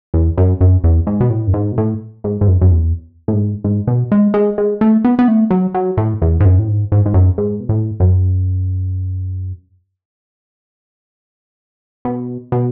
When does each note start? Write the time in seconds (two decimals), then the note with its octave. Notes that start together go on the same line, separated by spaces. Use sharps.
0.14 E2
0.38 F#2
0.61 F#2
0.84 E2
1.07 G#2
1.20 B2
1.30 A2
1.47 F#2
1.54 G#2
1.72 B2
1.78 A2
2.24 G#2
2.41 G#2
2.47 F#2
2.61 F#2
2.71 E2
3.28 A2
3.33 G#2
3.64 G#2
3.87 B2
4.12 G#3
4.34 G#3
4.58 G#3
4.81 A3
5.05 B3
5.19 B3
5.28 A3
5.51 F#3
5.74 F#3
5.97 A2
6.22 E2
6.40 G#2
6.45 F#2
6.59 A2
6.68 G#2
6.92 G#2
7.06 G#2
7.14 F#2
7.38 G#2
7.60 B2
7.69 A2
8.00 F#2
12.05 B2
12.52 B2